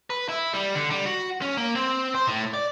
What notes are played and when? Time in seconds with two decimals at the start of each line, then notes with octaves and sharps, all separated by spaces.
0.10 B4
0.29 E4
0.53 G3
0.75 D3
0.90 G3
1.06 F#4
1.42 C#4
1.57 A#3
1.75 C4
2.15 C5
2.27 A2
2.54 D5